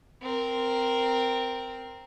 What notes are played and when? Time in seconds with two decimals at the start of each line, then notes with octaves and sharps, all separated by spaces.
0.22 C4 A#4